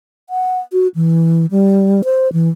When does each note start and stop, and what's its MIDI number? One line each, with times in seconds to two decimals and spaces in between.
0.30 0.59 78
0.72 0.87 66
0.95 1.46 52
1.51 2.02 55
2.04 2.31 72
2.33 2.49 52